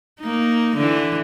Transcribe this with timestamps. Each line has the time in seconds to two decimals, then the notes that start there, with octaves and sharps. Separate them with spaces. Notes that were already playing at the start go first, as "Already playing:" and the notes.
0.20 A#3 D#4
0.76 D3 E3